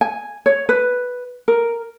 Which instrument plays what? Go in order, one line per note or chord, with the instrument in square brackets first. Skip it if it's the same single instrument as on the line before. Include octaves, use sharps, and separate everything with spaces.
[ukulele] G#5
C#5
B4
A#4